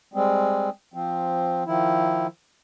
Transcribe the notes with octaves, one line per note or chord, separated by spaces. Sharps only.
G3 G#3 C4
F3 C4
D#3 F3 E4